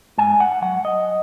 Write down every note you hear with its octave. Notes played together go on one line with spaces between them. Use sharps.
G#2 G#5
F#5
F#3 F#5
D#5